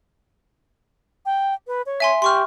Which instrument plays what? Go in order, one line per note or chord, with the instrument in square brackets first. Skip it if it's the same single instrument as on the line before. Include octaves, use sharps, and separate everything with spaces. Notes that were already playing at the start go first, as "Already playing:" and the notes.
[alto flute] G5
B4
C#5
[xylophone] E5 G#5 C6
[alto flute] G4 [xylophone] C6 C#6 F6